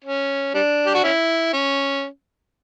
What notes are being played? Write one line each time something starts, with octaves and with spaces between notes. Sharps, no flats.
C#4
G3 D4
G4
F#4
C#4 E4
C#4